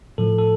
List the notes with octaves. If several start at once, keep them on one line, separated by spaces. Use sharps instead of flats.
A2 F3 A4
A4